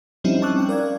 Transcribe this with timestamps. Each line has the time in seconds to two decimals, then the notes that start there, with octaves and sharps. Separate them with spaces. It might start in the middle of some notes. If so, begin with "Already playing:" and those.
0.24 F3 G3 C4 C#4 D#4 E4
0.42 A5 C#6 D6 E6 F#6
0.56 C#4 G5
0.69 A#4 D5 F5 G#6